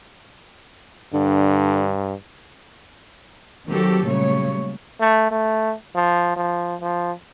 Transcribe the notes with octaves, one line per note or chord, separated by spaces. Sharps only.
G2 D3
D#3 F#3 C4 F#4 G4 A4
A#2 C#3 F#3 G3 A3 C#5
A3
A3
F3
F3
F3